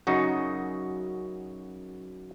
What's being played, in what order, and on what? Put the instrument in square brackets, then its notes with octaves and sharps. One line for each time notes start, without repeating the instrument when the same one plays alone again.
[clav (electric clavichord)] F#2 C#3 D#4 F#4